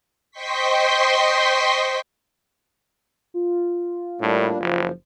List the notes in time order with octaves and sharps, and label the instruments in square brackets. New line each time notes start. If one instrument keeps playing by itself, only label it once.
[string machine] C5 D#5 G5 C6 C#6 B6
[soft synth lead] F4
[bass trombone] A2 [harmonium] G3 A#3 D4
[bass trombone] F#1 [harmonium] F3